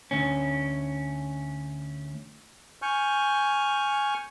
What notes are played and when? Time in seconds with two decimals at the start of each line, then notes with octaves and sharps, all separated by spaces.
0.11 D2 C#4
2.82 G#5 C#6 F6 G6